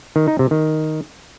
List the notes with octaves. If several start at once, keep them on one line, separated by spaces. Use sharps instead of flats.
D#3
D#4
C3
D#3